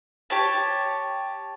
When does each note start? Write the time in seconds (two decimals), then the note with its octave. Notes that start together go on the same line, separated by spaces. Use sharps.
0.30 G4 C#5 A5